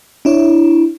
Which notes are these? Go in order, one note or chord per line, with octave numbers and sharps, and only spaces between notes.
D4 E4 C#5